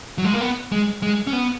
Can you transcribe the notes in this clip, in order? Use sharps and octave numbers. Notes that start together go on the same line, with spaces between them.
F#3
G#3
A#3
B3
G#3
G#3
C#4
B3